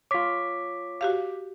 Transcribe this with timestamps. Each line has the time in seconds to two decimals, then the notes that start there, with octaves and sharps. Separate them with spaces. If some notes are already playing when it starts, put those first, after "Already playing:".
0.11 F4 C#5 D6 B6
1.01 F#4 G4 F5